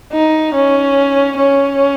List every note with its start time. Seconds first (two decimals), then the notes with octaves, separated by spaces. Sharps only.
0.13 D#4
0.54 C#4
1.37 C#4